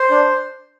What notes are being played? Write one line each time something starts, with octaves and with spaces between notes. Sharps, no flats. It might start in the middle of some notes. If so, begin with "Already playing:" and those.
Already playing: C5
D4